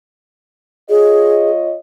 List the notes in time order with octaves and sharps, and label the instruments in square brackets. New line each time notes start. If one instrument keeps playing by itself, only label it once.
[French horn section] F4 C#5 D#5 [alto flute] G#4